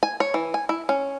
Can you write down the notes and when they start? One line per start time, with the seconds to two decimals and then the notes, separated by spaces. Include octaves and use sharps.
0.03 G#5
0.20 C#5
0.34 E3
0.54 G#5
0.69 E4
0.89 C#4